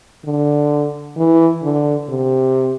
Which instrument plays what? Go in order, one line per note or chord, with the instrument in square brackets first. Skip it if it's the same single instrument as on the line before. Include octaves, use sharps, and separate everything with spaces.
[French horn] D3
E3
D3
C3